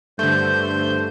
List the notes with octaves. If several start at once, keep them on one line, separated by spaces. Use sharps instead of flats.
G2 D3 A3 C5 G6